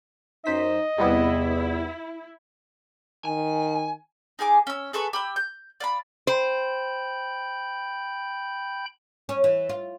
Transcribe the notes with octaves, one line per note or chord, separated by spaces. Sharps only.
F#2 D#4 C5 D#5 B6
E2 C3 G3 B3 E4
D#3 G#5
D#4 G#4 G#5 D6
C#4 E6
G#4 A4 B4 C#6
G4 B5 E6
G6
D5 F5 B5
C5 G5 B5 G6
C#4
E3
F4